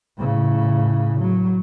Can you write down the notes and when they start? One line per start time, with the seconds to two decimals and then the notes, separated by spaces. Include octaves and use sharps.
0.17 A2 C#3
1.20 F#3